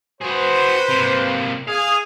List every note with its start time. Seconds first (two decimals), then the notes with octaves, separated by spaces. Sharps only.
0.21 F#4 G#4 B4 C5
0.90 C3 A#3
1.68 G#4 F5